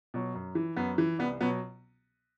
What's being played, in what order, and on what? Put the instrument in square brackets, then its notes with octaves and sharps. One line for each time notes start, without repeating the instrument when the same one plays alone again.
[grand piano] B2 F#3
F#2
E3
F#2 B3
E3
C2 B3
B2 F#3 B3